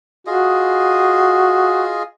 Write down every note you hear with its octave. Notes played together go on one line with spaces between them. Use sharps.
F4 F#4 G#4 D#5